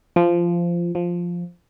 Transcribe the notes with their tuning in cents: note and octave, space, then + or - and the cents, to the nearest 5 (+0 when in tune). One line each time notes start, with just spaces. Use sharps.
F3 -15
F3 +0